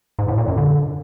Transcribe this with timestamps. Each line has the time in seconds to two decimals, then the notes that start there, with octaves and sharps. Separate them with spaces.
0.19 G#2
0.28 A2
0.38 A#2
0.48 F#2
0.58 D3